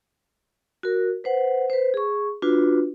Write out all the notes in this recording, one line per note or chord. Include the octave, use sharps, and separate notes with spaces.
F#4 A#4
B4 C5 F#5
B4 C5
G#4 C#6
D4 F4 F#4 B4